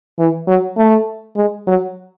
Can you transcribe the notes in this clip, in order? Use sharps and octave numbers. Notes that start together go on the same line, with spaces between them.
E3
F#3
A3
G#3
F#3